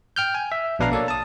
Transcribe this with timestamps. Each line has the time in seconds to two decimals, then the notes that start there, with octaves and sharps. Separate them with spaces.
0.16 G5 F6 G6
0.35 G#5
0.52 E5
0.79 A#1 B2 D4 B4 F5 A#5
0.92 A#3 A4 C#5 D5
1.08 A5 D#6